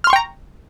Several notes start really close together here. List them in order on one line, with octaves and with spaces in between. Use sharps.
F6 C6 C#6 G5 A#5